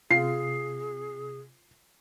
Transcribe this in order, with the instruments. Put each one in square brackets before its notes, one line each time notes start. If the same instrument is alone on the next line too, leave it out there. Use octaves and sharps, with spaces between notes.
[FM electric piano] C3 [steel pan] F4 [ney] G#4 [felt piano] C7